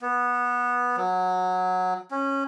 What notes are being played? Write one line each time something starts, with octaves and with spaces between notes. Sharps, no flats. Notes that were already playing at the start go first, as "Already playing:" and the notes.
B3
F#3
C#4